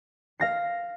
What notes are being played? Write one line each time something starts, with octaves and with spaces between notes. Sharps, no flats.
F5 A#6 C7